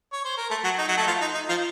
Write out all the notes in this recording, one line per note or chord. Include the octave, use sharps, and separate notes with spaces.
C#5
C5
A#4
A3 A4
F#3 F#4
D#4
F#3 F#4
A3 A4
F3 F4
D#4
D#4
F3 F4